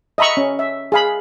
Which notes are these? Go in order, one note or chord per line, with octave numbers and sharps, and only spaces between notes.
D#5 E5 A#5 B5 C#6
C#4
E5
G#4 F5 B5